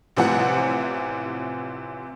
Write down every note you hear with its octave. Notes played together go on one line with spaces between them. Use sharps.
A1 C3 E3 F3 F#5